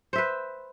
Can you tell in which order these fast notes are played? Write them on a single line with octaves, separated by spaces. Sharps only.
C5 E5 B4